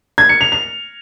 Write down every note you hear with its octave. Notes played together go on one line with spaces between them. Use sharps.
G#6
C#7
F7
F7